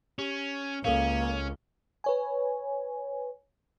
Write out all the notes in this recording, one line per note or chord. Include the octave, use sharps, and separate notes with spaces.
C#4 G4
C#2 A#3 C#4 A4 A#4 F5
B4 C#5 G#5